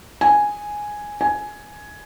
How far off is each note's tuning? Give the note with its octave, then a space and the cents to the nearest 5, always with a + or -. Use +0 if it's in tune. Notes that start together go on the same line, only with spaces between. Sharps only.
G#5 +0
G#5 +10